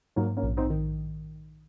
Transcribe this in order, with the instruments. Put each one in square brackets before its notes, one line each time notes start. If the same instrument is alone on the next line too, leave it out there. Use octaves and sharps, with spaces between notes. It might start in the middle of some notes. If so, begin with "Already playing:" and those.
[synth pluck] G#2 [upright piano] F#3 A#3
[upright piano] A#3 C#4
[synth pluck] A#1
[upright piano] C4 D#4
[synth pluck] D#3